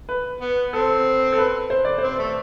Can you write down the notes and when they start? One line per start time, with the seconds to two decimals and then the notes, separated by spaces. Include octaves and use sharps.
0.09 B4
0.41 B3
0.73 C4 A4
1.32 A4
1.38 B4
1.70 C5
1.85 D5
1.98 C4 C5
2.19 A3